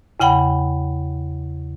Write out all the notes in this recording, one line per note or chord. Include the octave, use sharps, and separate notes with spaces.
E2 C#3 F#5 G5 B5